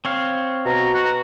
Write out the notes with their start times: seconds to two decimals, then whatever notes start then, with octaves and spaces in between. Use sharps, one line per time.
0.05 C4 C#5 F5
0.66 B2 A#5
0.94 F#4